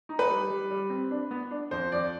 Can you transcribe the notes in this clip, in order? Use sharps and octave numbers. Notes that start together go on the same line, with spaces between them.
D#4
B4
G3
G3
G3
C4
D4
B3
D4
F2 C5
F2 D5